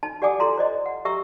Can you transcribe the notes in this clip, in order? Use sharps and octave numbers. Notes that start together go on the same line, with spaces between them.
D#4 A5
G4 D5 F#5 G#5 D6 D#6
E4 F4 A4 A#5 C6
C5 D5 D#5
F#5
G4 E5 A#5 C#6 E6